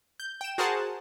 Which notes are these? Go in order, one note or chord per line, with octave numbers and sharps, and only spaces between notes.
G6
G5 E7
F#4 G#4 A#4 C5 F#5 A5